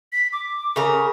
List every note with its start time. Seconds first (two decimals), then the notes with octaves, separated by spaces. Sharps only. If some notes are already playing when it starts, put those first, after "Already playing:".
0.12 B6
0.33 D6
0.76 C#3 A#4